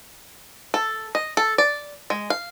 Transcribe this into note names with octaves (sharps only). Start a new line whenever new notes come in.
A4
D#5
A4
D5
G#3
F5